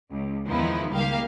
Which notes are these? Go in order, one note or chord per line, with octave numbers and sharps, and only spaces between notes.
C#2
E2 D#3 F3 B3 D#4 E4
C#2 G3 A#3 G4 F5